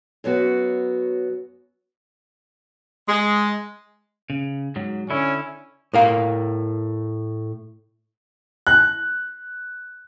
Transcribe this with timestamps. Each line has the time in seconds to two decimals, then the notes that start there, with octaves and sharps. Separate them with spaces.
0.24 F#2 F#3 B3 F#4
3.08 G#3
4.30 C#3
4.76 G#2 F#3
5.10 D3 C#4 E4
5.93 A2 A#4 F5
8.67 F#6